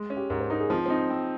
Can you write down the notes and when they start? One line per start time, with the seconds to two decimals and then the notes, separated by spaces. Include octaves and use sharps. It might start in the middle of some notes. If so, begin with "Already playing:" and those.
Already playing: G#3
0.10 C#4
0.17 G4
0.30 G#2 A#4
0.40 C5
0.50 D#4 A#4
0.60 G#4
0.70 F3 C4
0.86 C4 D#4
1.10 C4